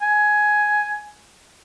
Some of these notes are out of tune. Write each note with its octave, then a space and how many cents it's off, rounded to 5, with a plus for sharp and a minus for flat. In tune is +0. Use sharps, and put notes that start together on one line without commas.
G#5 +10